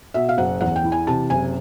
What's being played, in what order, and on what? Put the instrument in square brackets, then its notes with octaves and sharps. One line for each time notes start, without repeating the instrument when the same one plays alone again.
[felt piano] B2 E5
F5
F#1 F#5
E2 F#5
G5
E3
G#5
C3 A5
F#1 G#5